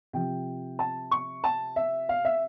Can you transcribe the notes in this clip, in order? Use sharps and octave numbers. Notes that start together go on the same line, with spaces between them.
C3 F3 G5
A5
C#6
A5
E5
F5
E5